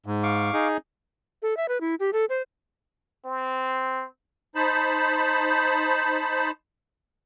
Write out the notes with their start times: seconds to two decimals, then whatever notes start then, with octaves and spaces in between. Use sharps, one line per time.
0.06 G#2
0.23 F5 C#6 D6
0.53 D#4 G#4
1.42 A4
1.57 E5
1.69 B4
1.81 E4
2.00 G4
2.13 A4
2.29 C5
3.25 C4
4.55 D#4 C5 A5 B5